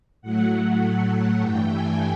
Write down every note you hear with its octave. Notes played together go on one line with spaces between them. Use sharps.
A2 F#3 A3 F#5
G2 E3 A3 G5
G#5